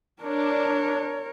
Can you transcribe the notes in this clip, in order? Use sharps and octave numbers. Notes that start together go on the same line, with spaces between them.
D4 A#4 C#5